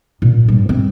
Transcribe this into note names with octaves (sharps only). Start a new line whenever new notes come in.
A#2
G2
C4